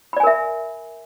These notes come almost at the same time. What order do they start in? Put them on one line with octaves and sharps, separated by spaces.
B5 D5 G#5 A#4 E5